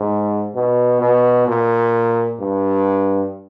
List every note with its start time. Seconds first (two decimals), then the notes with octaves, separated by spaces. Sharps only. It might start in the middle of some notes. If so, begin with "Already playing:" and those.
Already playing: G#2
0.55 B2
1.01 B2
1.48 A#2
2.40 G2